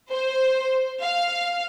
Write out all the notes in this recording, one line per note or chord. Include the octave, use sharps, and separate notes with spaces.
C5
F5